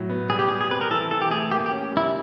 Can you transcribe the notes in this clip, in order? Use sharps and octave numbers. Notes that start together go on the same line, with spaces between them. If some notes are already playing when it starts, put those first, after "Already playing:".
Already playing: A2 F#3
B3
G3 G#4
G4
G3 G#4
G#4
C4 B4
A#4
E3 A4
E3 A4
G4
A3 G#4
A#3 G4
G4
C#4
G3
E4